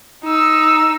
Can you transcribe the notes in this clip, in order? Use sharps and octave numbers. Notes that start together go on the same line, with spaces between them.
D#4 E6